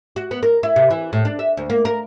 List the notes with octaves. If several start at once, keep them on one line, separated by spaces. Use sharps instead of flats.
F#4
B3
A#4
E4
C3
E3
A2
D4
E5
D2
A#3
A#4